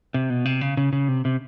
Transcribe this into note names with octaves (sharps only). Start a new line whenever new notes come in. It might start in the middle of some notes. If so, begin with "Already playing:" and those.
C3
B2
C3
C#3
C#3
C#3
C3
C3